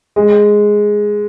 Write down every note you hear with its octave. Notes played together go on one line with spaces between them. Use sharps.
G#3